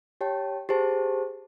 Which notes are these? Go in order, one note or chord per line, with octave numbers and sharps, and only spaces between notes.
G4 C#5 G5 A5
G4 G#4 C5 A5